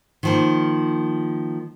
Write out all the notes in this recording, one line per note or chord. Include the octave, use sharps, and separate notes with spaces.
D#3 F3 A#3